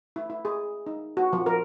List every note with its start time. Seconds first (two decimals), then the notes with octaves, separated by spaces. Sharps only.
0.16 E4
0.30 E4
0.45 G#4
0.86 D#4
1.17 F#4
1.33 F3
1.46 A#4